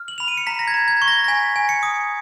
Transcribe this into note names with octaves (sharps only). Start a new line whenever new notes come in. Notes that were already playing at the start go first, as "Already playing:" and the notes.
Already playing: F6
F#7
B5 F7
D#7
C#7
A#5 B6
A#6
G#6
A#5
G#6
C#6
A#6
A#6
G#5 B6
G#5
C#7
D#6